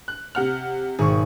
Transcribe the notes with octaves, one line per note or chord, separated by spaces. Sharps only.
F#6
C3 F#5 F6
G#1 B2 G#4 C#6